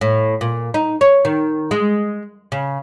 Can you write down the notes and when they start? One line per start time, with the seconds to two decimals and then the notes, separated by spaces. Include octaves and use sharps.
0.01 A2
0.41 A#2
0.74 D#4
1.01 C#5
1.25 D#3
1.71 G#3
2.52 C#3